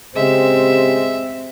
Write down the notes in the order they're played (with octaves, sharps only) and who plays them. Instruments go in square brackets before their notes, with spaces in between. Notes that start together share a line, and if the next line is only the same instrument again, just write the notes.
[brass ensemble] C#3 G4 [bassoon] G#3 [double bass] C4 [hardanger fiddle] E5